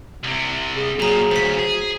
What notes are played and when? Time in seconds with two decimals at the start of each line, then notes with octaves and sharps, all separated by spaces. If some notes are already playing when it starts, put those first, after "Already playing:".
0.24 C2 C3
0.76 G#4
1.00 A#2 F#3 G#4 A#5
1.31 D2 C#3 C5 B6
1.58 G#4